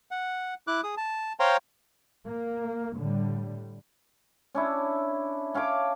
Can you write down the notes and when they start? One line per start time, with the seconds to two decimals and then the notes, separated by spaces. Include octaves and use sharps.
0.11 F#5
0.67 E4 D6 F#6
0.83 G#4 D#6
0.97 A5
1.40 C5 C#5 F5 G5 A#5 C6
2.27 A#3
2.97 A2 D3 G3
4.55 C#4 D4 E4
5.54 C#4 F5 A5 D6